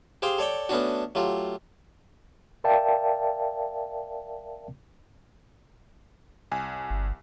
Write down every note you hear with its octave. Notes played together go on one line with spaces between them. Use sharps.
G4 G#4 C5 F5 G5
A4 C#5 D5 G5
A3 B3 C#4 D4 F#4
F#3 A3 F4 G4
A#4 D5 E5 F5 G5 A5
C2 G#5
G1